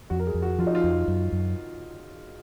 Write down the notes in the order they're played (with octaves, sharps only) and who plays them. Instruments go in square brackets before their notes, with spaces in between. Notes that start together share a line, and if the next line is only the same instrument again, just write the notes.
[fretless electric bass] F2 [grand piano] F#4
[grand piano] A#4
G#4
[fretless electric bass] F2
[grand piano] F#4
[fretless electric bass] F3 [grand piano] F4
[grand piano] D#4
F4
[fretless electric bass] F2
F#2
F#2